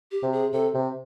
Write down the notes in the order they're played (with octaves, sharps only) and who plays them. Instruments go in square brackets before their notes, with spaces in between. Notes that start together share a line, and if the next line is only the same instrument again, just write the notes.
[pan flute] G4
[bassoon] C3
[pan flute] G#4
[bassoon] C3 [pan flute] A4
[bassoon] C3